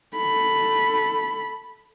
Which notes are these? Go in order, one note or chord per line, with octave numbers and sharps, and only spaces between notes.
A4 B5